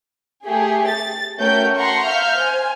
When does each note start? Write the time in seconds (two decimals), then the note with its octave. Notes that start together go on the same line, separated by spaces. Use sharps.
0.45 A3 G4 G#4
0.88 A6
1.38 A3 C#4 F#4 A#4 G5 G6
1.77 F#5 A5 A#5 C6 C#6
2.07 E5 F5 F6 G6
2.39 C5 G#5